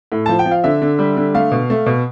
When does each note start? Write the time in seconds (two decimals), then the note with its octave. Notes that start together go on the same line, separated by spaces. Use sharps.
0.12 A2
0.26 F3 A5
0.39 G5
0.46 F3
0.51 F5
0.64 D3 E5
0.82 D3
0.99 G3
1.17 D3
1.35 A3 F5
1.52 B2
1.70 A3
1.86 B2